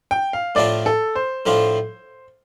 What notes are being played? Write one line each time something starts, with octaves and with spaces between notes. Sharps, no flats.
G5
F5
A2 F3 D4 F4 D5
A4
C5
A2 F3 D4 F4